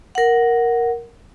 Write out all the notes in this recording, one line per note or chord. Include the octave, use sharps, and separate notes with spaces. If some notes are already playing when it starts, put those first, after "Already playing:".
A#4 F#5